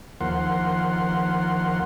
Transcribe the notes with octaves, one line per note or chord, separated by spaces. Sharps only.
D#2 F3 A#4 F#5 C6